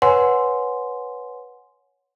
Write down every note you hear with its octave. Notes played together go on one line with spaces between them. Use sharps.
B4 C#5 F#5 G#5 C6